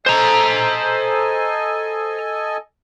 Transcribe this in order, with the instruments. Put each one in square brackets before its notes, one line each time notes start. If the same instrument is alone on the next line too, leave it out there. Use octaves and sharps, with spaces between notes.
[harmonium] A4 D#5 G#5 [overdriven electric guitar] C5 A#5